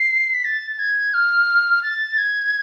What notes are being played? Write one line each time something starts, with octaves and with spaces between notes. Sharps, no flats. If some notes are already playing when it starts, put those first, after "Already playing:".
Already playing: C7
B6
A6
A6
G#6
F6
A6
G#6